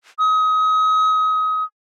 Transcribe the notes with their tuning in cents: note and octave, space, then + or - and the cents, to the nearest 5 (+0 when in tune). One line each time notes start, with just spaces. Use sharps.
D#6 +30